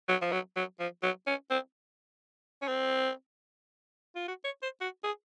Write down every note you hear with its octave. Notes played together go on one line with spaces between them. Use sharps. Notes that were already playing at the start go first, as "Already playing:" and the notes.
F#3
F3
F#3
F#3
F3
F#3
C#4
C4
C#4
C4
F4
F#4
C#5
C5
F#4
G#4